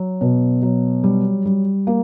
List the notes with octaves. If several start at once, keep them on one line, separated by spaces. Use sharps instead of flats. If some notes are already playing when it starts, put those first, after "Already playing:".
Already playing: F#3
B2
F#3
G3
G3
A#3